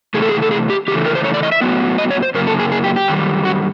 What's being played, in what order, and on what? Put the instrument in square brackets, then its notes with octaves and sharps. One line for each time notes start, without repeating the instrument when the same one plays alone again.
[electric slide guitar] C3 E3 A3 G#4
A4
G#4
A4
G#4
G4
C#3 E3 A3 G4
A#4
C5
C#5
D5
D#5
E5
A2 F#3 B3
D#5
C#5
C5
F#2 C#3 A#3 A#4
A4
G#4
G#4
G4
G4
F#2 D#3 G3
F#4